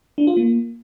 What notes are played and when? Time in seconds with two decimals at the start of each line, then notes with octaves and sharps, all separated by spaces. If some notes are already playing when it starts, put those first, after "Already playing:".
0.18 D4
0.27 F4
0.37 A#3